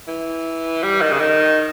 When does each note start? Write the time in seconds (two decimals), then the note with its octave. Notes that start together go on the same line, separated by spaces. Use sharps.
0.08 E3
0.83 G3
1.01 D#3
1.11 C#3
1.20 D#3